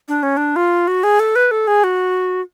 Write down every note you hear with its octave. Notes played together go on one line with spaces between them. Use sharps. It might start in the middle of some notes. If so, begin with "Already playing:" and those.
D4
C#4
D4
F4
F#4
G#4
A4
B4
A4
G#4
F#4